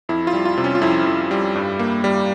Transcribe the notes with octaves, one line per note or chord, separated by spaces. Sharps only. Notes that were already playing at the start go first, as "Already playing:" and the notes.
F2 E4
F4
G3
F4
C3
C#4
F4
F2 E4
F2
G3
G2
A#3
G3